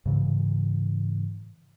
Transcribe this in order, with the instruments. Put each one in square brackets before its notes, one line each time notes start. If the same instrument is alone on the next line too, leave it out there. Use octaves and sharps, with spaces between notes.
[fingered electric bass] G#2 C#3 E3